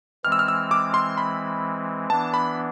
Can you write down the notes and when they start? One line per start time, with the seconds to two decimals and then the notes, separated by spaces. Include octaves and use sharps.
0.24 E3 G#3 C4 F6
0.32 E6
0.39 F6
0.48 E6
0.71 D6
0.94 C6
1.18 B5
2.10 E3 B3 D4 A5
2.34 B5